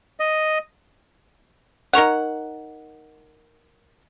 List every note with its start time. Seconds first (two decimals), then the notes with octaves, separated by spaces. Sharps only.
0.20 D#5
1.93 D#4 A#4 C#5 F#5